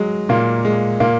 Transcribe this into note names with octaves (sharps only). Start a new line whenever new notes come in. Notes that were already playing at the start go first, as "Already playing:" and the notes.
Already playing: F#3 G#3
A#2 A#3
G#3
A#2 A#3